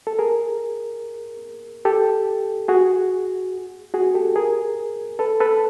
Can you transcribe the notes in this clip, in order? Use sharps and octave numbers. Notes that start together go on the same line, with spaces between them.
A4
G#4 A#4
G4 A4
F#4 G#4
F#4 G#4
G4 A4
G#4 A#4
A4 B4
A4 B4